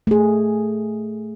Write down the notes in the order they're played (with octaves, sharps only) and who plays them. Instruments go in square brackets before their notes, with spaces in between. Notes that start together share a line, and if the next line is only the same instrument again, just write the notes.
[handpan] A3 G#4